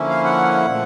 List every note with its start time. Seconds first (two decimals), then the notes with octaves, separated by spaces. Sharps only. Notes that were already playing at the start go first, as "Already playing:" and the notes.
Already playing: D3 F3 A#3 C#4 E4
0.09 F5
0.24 F#5
0.67 A#2 F3 A3